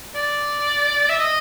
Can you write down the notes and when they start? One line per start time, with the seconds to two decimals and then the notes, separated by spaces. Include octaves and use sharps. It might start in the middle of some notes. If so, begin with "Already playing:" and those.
0.15 D5
1.09 E5
1.19 D#5